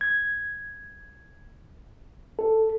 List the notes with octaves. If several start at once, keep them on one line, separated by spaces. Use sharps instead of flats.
G#6
A4